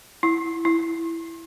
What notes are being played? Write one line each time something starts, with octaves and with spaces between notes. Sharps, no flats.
E4
E4